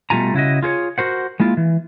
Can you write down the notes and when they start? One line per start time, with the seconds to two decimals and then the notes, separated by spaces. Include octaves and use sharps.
0.10 B2 G3 A3 F4 G#5 A#5
0.34 C#3 E4 F#4 D#5
0.63 F4 G#4 C5 C#5
0.98 F#4 A#4 C5 F#5
1.40 G#3 A#3 E4 F4
1.57 E3